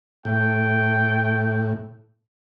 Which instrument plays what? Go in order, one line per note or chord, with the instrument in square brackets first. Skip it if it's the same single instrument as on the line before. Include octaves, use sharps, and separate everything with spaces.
[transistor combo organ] A2 [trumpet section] A3 G5